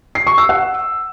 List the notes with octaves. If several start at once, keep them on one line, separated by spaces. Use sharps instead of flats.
C7
C#6
E6
F#5